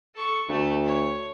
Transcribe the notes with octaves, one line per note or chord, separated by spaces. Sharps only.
A4 C#6
D2 A3
C#5